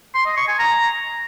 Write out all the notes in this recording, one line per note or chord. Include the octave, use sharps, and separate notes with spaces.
C6
D#5
C#6
G#5
A#5